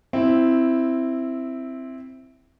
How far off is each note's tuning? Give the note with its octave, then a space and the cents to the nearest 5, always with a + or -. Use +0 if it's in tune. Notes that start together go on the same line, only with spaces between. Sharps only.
C4 +0 E4 +0